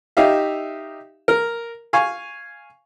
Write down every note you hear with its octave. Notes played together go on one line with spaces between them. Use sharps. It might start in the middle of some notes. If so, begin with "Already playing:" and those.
D#4 G4 E5 F5
A#4
F5 G#5 C#6